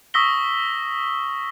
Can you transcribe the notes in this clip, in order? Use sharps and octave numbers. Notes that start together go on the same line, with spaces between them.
C#6 D#6 E6 A#6 B6 G7